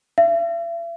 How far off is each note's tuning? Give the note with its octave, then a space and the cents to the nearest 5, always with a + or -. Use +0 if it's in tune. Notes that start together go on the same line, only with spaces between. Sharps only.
E5 +45